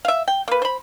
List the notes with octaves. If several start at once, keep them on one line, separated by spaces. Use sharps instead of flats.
E5 F5
G5
A#3 B4
C5 B5